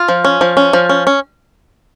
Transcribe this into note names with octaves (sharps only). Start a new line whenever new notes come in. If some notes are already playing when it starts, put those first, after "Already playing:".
Already playing: F4
F3
C#4
F3
C#4
F3
C#4
C#4